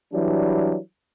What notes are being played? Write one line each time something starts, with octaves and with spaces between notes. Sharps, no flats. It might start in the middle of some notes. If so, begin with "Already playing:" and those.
E3 F#3 G3 D4